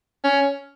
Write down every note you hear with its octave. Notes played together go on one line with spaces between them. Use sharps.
C#4